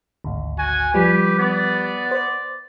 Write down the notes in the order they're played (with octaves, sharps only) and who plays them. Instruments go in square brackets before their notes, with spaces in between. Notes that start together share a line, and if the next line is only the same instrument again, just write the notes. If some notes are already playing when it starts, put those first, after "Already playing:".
[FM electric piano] G#1 D2
[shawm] F#4 [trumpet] G#5
[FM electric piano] F3 G3 [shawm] G4 [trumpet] B4
[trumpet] B3 [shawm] D5
[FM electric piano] C5